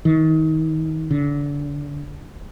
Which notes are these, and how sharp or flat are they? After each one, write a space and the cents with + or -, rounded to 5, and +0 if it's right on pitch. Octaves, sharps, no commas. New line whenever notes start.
D#3 +30
D3 -30